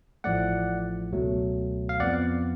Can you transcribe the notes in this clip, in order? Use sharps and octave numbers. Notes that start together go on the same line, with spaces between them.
A1 A2 F3 A3 D5 F#5
C#2 B2 F#3 A3
F5
F2 F3 B3 D5 F#5